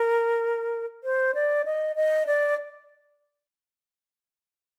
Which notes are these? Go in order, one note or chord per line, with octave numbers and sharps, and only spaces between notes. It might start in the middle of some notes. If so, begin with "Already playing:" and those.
Already playing: A#4
C5
D5
D#5
D#5
D5